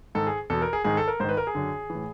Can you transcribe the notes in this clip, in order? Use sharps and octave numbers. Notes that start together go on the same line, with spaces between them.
G#2 D#3 A4
G#4
E2 B2 A4
A#4
G#4
G#2 D#3 G#4
A4
A#4
G#2 D#3 C5
B4
A#4
G#4
F#2 D3
E3
A2